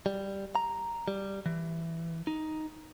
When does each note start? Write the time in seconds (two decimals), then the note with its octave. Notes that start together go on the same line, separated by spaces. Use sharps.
0.06 G3
0.55 A#5
1.08 G3
1.46 E3
2.27 D#4